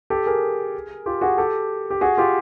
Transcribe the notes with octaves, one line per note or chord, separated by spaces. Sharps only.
G4 A4
G#4 A#4
F4 G4
F#4 G#4
G4 A4
G4
F#4 G#4
F4 G4